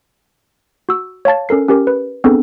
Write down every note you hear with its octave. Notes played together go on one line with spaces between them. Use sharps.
F#4 E6
C#5 F5 A5 A6
C#4 A4 A#4 C7
C#4 G4 A#4
B4
B3 C4 D4 G#4 A4